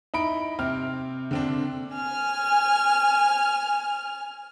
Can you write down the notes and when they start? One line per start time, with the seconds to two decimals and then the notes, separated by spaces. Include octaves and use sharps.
0.14 D#4 E4 B5 D7
0.59 C3 C4 F6
1.31 D3 C4 D4
1.94 G#5 F6